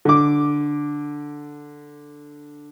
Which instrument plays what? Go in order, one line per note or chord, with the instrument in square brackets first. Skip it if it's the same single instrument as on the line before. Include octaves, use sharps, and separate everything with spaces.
[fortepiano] D3 D6